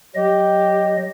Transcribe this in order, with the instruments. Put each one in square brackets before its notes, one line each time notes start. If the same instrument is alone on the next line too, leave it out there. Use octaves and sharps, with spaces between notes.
[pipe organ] F#3 D#5 [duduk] G4